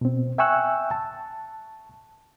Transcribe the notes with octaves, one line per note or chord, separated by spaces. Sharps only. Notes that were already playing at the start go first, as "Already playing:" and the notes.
B2 C4
E5 G5 G#5 C#6 E6 F#6
A5